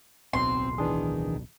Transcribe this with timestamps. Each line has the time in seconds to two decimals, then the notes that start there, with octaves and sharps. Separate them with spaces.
0.33 D1 B1 B2 C4 C6
0.78 D#3 E3 D4 G#4